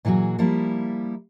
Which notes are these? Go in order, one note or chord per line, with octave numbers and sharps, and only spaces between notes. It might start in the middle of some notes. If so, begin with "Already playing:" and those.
A#2 E3 F#3 F#4 G#4
F3 G3 A#3 E4